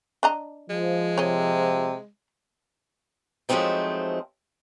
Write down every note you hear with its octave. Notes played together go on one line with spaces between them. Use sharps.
D4 D#5 A#5
F3 G#3
C3 C#5 D#5
F3 F#3 G#3 A3 C4 D#4